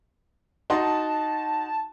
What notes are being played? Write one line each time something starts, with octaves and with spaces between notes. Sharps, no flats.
D#4 F#4 A5 C6